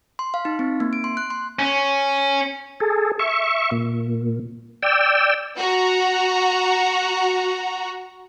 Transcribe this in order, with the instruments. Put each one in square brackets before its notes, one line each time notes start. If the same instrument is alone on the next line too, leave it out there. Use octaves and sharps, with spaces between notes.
[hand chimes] C6
F5
D#4
C4
A#3
D7
C6
F#6
C6
[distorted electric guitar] C#4
[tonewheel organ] G#4 A4
E5 C#6
A#2
D5 G5 E6
[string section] F#4 A#5